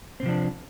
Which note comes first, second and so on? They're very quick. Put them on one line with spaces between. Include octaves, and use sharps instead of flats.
C4 C3 F3 D4